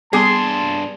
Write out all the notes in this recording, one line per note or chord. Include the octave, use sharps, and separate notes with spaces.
G2 G3 B3 G#4 A5 C6 D6